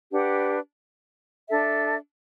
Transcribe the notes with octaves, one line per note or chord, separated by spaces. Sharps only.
D4 G4 B4 F#5
D4 A4 E5